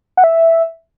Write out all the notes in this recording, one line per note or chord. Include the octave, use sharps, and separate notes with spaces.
F#5
E5